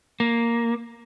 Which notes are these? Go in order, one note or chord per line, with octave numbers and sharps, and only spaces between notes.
A#3